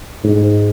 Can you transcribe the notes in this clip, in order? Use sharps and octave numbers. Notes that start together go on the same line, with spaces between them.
G#2